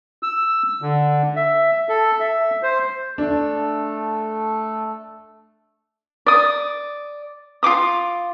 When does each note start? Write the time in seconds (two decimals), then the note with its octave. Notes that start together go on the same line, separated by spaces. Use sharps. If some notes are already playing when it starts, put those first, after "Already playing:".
0.23 E6
0.82 D3
1.36 E5
1.89 A4
2.20 E5
2.63 C5
3.18 A3 D4 A4
6.26 D5 D#6
7.63 F4 C#5 D6 D#6